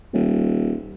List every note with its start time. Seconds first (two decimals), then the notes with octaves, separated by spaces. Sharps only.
0.14 D#1